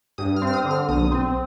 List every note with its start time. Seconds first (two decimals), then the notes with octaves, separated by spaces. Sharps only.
0.18 G2 D#6
0.36 F6
0.42 C4
0.47 F6
0.54 D#6
0.65 D3
0.71 F6
0.89 B1 D#6
1.12 C4